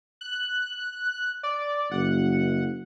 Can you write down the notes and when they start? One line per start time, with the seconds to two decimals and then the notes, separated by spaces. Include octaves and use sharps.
0.21 F#6
1.43 D5
1.92 F#1 F#5